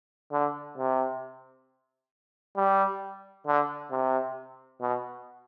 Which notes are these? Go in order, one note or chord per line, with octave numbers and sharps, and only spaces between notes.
D3
C3
G3
D3
C3
B2